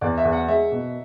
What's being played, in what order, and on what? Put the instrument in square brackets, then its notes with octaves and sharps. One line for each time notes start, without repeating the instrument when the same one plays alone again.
[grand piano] E2 [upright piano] D5
[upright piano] E5
[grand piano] E2
[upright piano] F#5
[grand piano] G#3 [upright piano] E5
[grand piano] B2